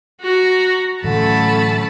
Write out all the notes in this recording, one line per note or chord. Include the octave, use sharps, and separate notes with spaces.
F#4 A#5
A2 D3 E3 F#3 A3 C#4 A5 B5